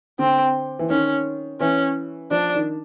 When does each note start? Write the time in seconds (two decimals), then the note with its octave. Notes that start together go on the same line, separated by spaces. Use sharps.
0.19 D3 C4
0.79 E3
0.90 D#3 C#4
1.60 E3 C#4
2.31 F3 D4
2.54 D#3